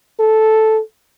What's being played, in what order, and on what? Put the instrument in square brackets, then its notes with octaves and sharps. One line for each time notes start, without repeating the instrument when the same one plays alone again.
[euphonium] A4